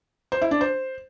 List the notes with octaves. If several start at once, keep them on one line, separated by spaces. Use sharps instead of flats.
C5
E4
D4
C5